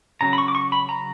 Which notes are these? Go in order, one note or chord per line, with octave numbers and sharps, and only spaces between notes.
C#3 F#3 C#4 A#5
B5
C#6
D6
C#6
B5
A#5